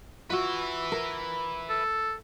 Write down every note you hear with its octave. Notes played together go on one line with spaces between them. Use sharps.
F4 F#4 B4 E5
A#4
A4